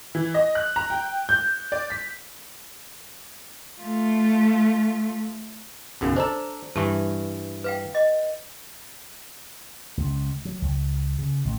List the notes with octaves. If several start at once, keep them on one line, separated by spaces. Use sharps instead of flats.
E3
D#5
F#6
A#5
G5
G6
D5
B6
A3 F4
B1 F#2 C#3
D4 A4 C5 D5 A#5
G2 E3 A5 C#6
B4 F5 G5
D#5
C#2
F#3
C#2
C#3
A1